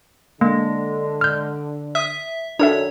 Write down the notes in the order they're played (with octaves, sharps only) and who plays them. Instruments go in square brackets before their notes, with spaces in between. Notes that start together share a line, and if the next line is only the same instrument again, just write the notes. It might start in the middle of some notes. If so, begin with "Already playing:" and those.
[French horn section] D3 [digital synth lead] G#3 [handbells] A#3
[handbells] F6 G6
[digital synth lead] E5 [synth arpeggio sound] D#6
[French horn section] F#2 D#3 [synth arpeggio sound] D4 A4 E5 [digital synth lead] C#5